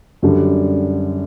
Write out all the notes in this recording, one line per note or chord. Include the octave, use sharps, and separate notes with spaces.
F#2 D3 G3